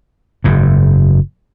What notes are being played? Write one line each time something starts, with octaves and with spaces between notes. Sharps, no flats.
F#1 G#2